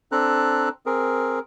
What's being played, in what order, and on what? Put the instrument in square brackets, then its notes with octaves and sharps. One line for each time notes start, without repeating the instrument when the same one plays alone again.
[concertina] C4 D4 A4 A#5 F#6
C4 G#4 A#4